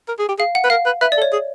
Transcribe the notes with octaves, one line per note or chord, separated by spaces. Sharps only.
A#4
G#4
G4
G#4 F5
F#5
B4
A#4 F5
B4
B4 E5
D5
A4
C#5
G#4